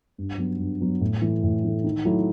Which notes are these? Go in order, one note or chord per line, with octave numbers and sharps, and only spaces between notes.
G2
F#3 B3
G2
F#3 B3
A2
E3 A3
A2
E3 A3
D#3
F#3 A3 E4